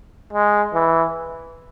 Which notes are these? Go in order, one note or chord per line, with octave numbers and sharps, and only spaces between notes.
G#3
E3